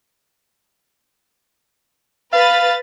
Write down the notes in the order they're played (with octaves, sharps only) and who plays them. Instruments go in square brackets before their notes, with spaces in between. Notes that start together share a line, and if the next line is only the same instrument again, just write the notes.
[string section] B4 A6 [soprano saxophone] F5